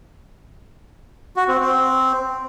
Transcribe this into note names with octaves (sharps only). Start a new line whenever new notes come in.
F#4
C4
C4